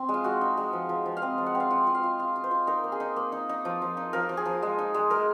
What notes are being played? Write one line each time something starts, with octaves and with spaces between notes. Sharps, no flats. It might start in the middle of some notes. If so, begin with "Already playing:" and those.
Already playing: C4
G#3
F4
G#3 F#4
D#4
G#3
F3
F3
F3
F5
C4 D#5
F3
F#5
C4
F5
F4 F#5
F4
F5
F4
F4
F4
C5
F4
D#4 A#4
A#3
G#4
D#4
A#3
D#4
D#4
F3
F3
D#4
F3 A#4
F3
G#4
F3
G#3
D#4
G#3
G#3 A#4